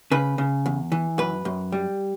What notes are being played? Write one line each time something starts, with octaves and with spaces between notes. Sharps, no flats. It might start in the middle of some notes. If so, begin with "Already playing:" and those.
C#3 B4
C#3
E2
E3
F#2 B4
F#2
G3